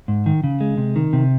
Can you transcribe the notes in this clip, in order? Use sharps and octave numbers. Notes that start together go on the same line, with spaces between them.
G#2
D#3
C#3
G#3
C3
D#3
C3